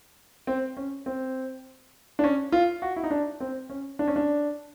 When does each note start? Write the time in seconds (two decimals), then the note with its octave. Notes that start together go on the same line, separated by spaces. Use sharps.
0.47 C4
0.77 C#4
1.06 C4
2.19 D4
2.24 C#4
2.52 F4
2.82 F#4
2.96 E4
3.04 D#4
3.11 D4
3.40 C4
3.70 C#4
3.99 D4
4.08 C#4
4.16 D4